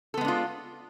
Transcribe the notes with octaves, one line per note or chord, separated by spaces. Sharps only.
G#3 B3 D4 F4 A4